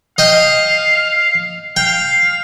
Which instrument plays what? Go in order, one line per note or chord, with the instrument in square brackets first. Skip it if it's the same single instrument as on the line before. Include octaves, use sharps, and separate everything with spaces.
[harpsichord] D#5 G5 [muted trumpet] F5
[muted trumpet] F5 [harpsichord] G5